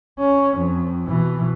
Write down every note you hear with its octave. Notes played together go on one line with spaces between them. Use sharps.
C#4
F2
B2 E3